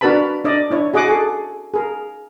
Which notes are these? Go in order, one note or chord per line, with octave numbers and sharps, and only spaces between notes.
D4 F#4 A#4 B4 A5 B5
D4 D5 D#5
D4 E4 C#5
F#4 G#4 D#5 F#5 D6
G#4 A4
G#4 A#4